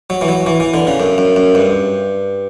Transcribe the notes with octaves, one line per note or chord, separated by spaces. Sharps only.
F#3
E3
F#3
E3
E3
D3
C#3
F#2
F#2
F#2
G2